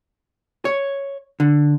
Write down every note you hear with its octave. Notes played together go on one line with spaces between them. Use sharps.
C#5
D3